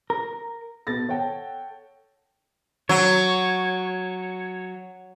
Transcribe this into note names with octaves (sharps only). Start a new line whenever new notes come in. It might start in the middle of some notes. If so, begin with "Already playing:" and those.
A#4
B2 B3 A4 A6 A#6
A4 C#5 F#5 G5 A5
F#3 C#5